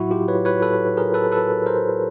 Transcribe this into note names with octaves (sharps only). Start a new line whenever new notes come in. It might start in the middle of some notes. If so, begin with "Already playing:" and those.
Already playing: A2 F#3 E4 F#4
F4 G4
B4 C#5
B4 C#5
A4 B4
G#4 A#4
A4 B4
A4 B4
A#4 C5